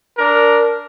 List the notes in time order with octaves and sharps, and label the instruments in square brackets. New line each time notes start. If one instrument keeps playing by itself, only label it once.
[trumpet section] D4 A#4